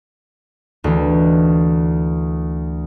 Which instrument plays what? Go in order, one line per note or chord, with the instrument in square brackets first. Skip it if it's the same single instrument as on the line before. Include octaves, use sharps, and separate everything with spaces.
[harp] D2 E3